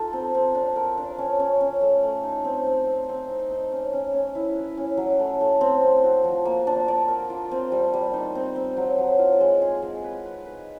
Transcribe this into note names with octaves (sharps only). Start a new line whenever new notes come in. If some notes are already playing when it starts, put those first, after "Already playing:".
Already playing: D#4 F4 A4
C4
C4
D4
A#4
D4
C#4
C#4
C#4
A3
A3
D#4
C4
C4
C4
C4
D#4
D#4
C#4
C#4
C#4
E4
B4
C#4
F#3
A3
A3
C4
C4
F#4
F3
A#3
D4
D5
A#4
F4
C4
G3
G3
D#4
C4
C4
F#3
F#3
F4
G#3
G#4
G#3
B4
B4
B4